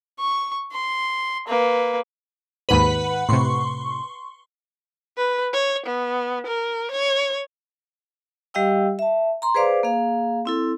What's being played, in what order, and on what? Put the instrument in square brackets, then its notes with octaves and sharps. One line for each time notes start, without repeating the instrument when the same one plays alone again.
[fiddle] C#6
C6
A#3 B4
[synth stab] D#2 G#2 D#7 [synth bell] B4 F#5 B5
[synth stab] A2 C3 [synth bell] C6 C#6
[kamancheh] B4
C#5
B3
A#4
C#5
[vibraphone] G3 G4 D#5 F5 G5 E6
E5 A5
A#5 C6
G#4 B4 C5 D5 F5 D6
A#3 G#4 F5
C4 E4 A4